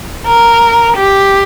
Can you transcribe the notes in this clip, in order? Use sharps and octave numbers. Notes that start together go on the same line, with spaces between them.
A#4
G4